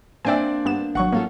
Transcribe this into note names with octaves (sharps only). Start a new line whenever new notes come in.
A#3 C4 D4 D5 E5 G5 G#5
G2 B3 E7
G#1 F#3 F#5 C#6
A#3 C#4 F4 A4